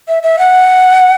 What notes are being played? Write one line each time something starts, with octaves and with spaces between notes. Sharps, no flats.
E5
E5
F#5